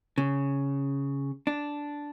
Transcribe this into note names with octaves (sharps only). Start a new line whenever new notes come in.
C#3
D4